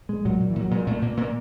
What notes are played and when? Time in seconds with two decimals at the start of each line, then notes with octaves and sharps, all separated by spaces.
0.09 A#2 G#3
0.25 A#2 F#3
0.40 A#2
0.50 E3
0.56 A#2 F#3
0.71 A#2 G#3
0.87 A#2 A3
1.02 A#2 A#3
1.17 A#2 A#3